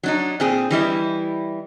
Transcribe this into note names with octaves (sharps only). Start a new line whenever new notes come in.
F#3 D4 D#4
A#2 C4 G#4
E3 G3 E4 D#5